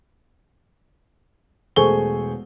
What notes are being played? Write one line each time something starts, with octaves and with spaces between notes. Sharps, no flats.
E1 A3 G#4 C5 C#6 G7